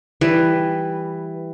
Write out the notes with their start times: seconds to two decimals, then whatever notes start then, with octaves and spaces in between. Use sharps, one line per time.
0.21 E3 G3 B4